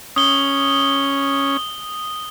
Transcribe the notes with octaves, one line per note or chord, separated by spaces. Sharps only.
C#4 D#6 G7